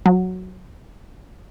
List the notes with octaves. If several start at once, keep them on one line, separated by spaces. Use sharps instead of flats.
F#3